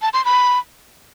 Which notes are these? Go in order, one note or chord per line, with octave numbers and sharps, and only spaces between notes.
A5
C6
B5